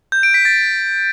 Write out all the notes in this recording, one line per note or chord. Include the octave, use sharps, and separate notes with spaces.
G6
D7
B6
A6